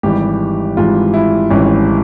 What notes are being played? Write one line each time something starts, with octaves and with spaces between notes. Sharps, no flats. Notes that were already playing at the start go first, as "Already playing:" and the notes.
G#1 G#2 E3 G3 G4
G#1 G#2 E3 G3 F4
E4
G#1 G#2 E3 G3 C#4